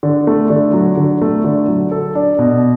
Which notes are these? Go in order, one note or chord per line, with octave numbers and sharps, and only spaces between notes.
D3
A3
D3
F#3
D3
A3
D3
F#3
A4
D4
B2